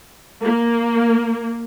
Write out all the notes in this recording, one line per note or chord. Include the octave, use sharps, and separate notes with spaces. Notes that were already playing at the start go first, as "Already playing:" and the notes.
A#3